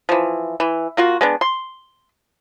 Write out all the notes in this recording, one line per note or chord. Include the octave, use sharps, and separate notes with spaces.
E3 F3
E3
A#3 F4 F#4
G#3 B3 D4
C6